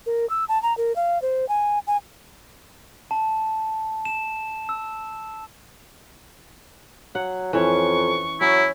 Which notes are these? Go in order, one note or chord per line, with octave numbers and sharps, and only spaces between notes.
A#4
E6
A5
A#5
A#4
F5
C5
G#5
G#5
A5
E7
E6
F#3 F#5
F2 E3 C#4 C#6
F#3 C#4 E4